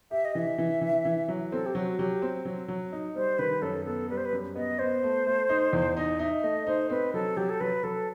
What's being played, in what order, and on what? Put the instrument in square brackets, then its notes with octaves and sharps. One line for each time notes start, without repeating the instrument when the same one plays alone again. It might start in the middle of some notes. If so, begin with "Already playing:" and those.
[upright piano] G4 [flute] E5
[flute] D#5
[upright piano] E3 [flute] E5
[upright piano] E3
E3
E3
F#3
[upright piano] C4 [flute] A4
[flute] G4
[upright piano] F#3 [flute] F#4
[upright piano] F#3 [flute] G4
[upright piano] C4
F#3
F#3
D#4
[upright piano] G3 [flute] C5
[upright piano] D#3 [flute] B4
[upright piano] F#2 [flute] A4
[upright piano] B3 [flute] A4
[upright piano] G3 [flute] B4
[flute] C5
B4
[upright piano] F#2
[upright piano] B3 [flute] D#5
[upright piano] B3 [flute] C5
[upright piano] A3
A3
D#4
E2
[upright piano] D#4 [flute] D#5
[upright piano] D#4 [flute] E5
[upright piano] A3 [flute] D#5
[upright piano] D#4 [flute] C5
[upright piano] C4 [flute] B4
[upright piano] F#3 [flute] A4
[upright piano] F#3 [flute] G4
[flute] A4
[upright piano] F#3 [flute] B4
[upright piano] F#3 [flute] A4